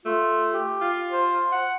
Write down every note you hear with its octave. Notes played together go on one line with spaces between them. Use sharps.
A3 F4
G4
F4
C5
F#5